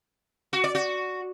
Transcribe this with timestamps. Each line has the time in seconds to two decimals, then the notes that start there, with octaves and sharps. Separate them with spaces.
0.53 F#4
0.64 D5
0.75 F#4